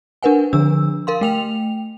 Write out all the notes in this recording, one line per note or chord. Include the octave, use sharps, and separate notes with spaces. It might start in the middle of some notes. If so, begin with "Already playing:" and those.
D4 A#4 B4 F#5 G#5
D3 F3 D4 E6
A#4 F5 C6
A3 G5 F7